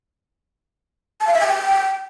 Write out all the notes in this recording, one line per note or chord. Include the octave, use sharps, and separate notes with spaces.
A5
F5
E5
G#5
G5